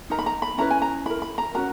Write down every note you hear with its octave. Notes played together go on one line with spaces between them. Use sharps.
D#4 A#4 A#5
B5
A#5
B5
C#4 E4 B4 A#5
G#5
A#5
E4 A#4 B5
B5
A#5
C#4 F#4 A#4 A#5